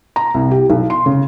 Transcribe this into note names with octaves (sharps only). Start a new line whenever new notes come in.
A#5
C2
G4
B1
C6
C#3